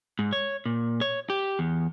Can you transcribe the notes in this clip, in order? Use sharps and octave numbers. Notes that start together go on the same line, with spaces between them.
G#2
C#5
A#2
C#5
G4
E2